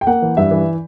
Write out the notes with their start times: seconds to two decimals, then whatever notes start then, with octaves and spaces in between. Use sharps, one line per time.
0.01 G5
0.07 A#3 F#5
0.22 E3
0.37 G2 E5
0.51 E3